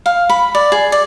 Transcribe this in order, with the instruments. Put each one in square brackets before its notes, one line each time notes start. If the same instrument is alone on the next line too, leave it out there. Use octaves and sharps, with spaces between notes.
[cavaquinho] F5
B5
D5
G#4
D5